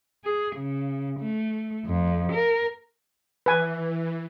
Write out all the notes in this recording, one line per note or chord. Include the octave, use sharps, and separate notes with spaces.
G#4
C#3
A3
F2
A#4
E3 B4 G#5